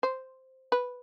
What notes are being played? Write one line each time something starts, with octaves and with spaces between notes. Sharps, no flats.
C5
B4